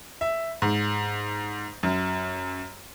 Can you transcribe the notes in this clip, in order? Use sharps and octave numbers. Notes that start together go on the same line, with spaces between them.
E5
G#2
F#2